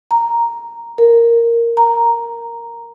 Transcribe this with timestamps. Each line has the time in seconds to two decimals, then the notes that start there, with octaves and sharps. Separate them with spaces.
0.11 A#5
0.98 A#4
1.77 A#5